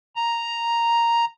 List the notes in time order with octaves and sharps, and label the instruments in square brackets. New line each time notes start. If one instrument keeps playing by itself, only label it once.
[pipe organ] A#5